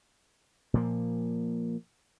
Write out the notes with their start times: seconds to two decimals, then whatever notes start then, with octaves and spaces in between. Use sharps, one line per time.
0.74 A#2 F3 A#3